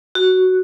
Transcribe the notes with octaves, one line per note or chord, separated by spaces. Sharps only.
F#4